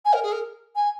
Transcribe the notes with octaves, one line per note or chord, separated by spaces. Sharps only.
G#5
A#4
G#4
A#4
G#5